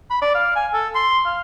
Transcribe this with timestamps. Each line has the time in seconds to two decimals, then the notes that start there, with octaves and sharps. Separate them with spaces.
0.10 B5
0.22 D5
0.35 F5
0.56 G#5
0.73 A4
0.95 C6
1.25 F5